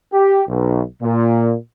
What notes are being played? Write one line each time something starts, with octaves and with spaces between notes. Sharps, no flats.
G4
B1
A#2